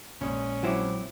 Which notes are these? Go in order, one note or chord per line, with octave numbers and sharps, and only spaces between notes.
A#1 G#3 C#4 D#6
F#3 C4 E4 F4 C5 D6